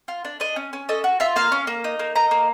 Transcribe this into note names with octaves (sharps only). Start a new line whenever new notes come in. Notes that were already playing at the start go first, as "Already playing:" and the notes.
F4
D4
D4 D#5
C#4
C#4
A4 D#5
F#4
F4 E5
A#3 F5
C#4
A#3
D#4
A#3
D#4 A#5
A#3